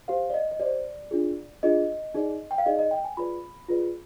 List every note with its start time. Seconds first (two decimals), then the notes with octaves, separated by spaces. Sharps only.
0.08 G4 C5 F5
0.30 D5
0.34 D#5
0.51 D#5
0.59 G4 C5 D5
1.11 D4 F4 G#4
1.63 D4 F4 G#4 D#5
2.14 D#4 G#4 D5
2.51 G5
2.58 F5
2.66 D#4 G#4 D5 D#5
2.79 D#5
2.91 G5
3.05 G#5
3.17 F4 G#4 B4 D5 B5
3.69 F4 G#4 B4 D5